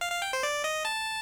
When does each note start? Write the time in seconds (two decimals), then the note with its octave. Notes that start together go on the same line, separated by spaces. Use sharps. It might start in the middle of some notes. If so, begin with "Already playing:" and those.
0.01 F5
0.12 F5
0.22 G5
0.33 C5
0.43 D5
0.64 D#5
0.85 A5